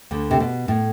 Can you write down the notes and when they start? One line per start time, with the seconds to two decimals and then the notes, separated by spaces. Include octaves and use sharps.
0.11 D2 D3
0.31 C3
0.40 B2
0.68 A2